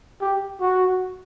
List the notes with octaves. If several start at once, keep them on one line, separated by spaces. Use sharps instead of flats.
G4
F#4